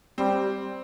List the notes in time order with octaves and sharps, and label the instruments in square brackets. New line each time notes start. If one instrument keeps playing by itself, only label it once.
[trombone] G3 [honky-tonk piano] C4